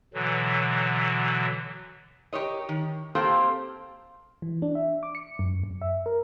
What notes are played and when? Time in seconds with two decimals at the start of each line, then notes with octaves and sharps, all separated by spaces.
0.14 B2 D3 E3 F#3
2.33 G4 A#4 C#5 D#5
2.69 D#3
3.15 A#3 C4 G4 A4 C5 F5
4.42 E3
4.62 D4
4.75 E5
5.03 D6
5.15 C#7
5.39 F#2
5.64 F#2
5.82 E5
6.06 A#4